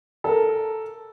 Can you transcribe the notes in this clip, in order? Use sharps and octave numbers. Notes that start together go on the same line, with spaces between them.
A4 A#4